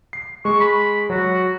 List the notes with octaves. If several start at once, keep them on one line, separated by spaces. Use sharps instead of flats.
C7
G#3 C#6
B5
F#3 F#4